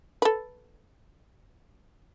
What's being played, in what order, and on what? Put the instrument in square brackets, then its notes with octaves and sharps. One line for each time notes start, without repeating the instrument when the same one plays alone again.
[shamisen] A4 B4